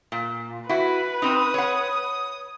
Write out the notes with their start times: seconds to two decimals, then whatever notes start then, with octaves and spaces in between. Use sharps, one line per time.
0.12 A#2
0.69 E4 F#4 B4
1.22 C4 D#4 D#6
1.54 C#5 F#5